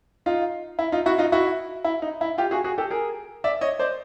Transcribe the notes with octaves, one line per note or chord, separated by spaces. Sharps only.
D#4 F4
E4
D#4 F4
E4 F#4
D#4 F4
E4 F#4
E4
D#4
E4
F4 G4
F#4 G#4
F#4 G#4
G4 A4
G#4 A#4
D5 E5
C#5 D#5
C5 D5